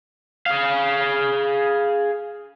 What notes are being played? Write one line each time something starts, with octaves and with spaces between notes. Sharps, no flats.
G#4 F5